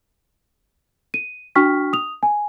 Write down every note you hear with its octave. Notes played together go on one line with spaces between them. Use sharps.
D#7
D4 F#4 G5 C#6 F6 B6
D#6 F7
G#5